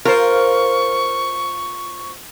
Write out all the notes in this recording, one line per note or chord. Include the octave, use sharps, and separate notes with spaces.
F4 A#4 C5 C#6